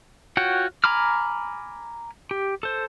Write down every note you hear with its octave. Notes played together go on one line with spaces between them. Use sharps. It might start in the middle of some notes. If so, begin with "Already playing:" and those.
F4 F#4 C#5 F#5 G5
G#5 A#5 B5 D6 F6
G4
A4 C5